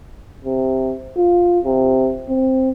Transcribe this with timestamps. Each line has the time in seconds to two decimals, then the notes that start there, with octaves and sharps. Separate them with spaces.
0.45 C3
1.17 F4
1.65 C3
2.29 C4